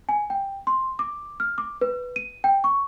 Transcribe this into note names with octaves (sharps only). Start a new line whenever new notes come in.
G#5
G5
C6
D6
F6
D6
B4
D#7
G5
C#6